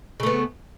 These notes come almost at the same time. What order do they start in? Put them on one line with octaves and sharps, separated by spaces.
C#3 A3 B3